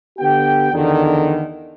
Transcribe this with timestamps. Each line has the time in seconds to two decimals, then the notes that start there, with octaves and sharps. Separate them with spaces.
0.19 D3 B3 G4 G5
0.73 E2 D3 D#3